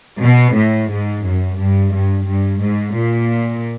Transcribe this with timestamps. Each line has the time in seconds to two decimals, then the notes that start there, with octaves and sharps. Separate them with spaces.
0.23 B2
0.57 A2
0.91 G#2
1.25 F#2
1.60 G2
1.94 G2
2.28 G2
2.63 G#2
2.97 A#2